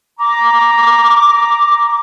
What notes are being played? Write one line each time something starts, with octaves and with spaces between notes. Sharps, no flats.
A#5 D6